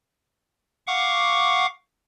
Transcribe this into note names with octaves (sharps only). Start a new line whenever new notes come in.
F5 F#5 C#6 D6